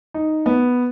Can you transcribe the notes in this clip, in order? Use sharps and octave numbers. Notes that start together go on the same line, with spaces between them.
D#4
B3